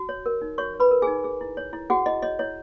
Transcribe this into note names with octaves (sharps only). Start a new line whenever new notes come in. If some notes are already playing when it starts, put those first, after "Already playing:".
Already playing: F#4
C#5
A#4
D#4
F#4 C#5 C#6
C#5
B4 B5
A#4
D#4 G#4 G#5
G#4
E4
C#5
E4
F#4 G#4 F#5
E4 D#5
C#5 D#5
E4 C#5